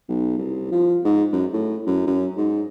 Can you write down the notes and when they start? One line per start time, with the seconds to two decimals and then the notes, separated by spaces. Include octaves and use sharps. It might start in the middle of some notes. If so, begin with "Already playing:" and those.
0.09 B1
0.38 C2
0.71 F3
1.04 G#2
1.32 F#2
1.53 A2
1.87 F#2
2.06 F#2
2.37 G#2